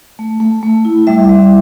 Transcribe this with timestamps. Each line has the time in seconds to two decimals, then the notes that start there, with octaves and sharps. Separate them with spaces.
0.19 A3
0.40 A3
0.63 A3
0.85 E4
1.07 G3 E5
1.29 G3